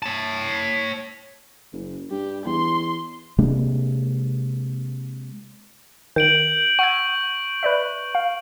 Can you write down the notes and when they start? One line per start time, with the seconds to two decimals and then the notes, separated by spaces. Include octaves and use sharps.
0.03 C#5 A5
1.73 F#1
2.11 G2 G4
2.46 E2 C6
3.38 C3 G#3 A#3 D4
6.16 D#3 G6 D7 F#7
6.79 F#5 C#6 E6 G#6
7.63 B4 D5 E5
8.15 F5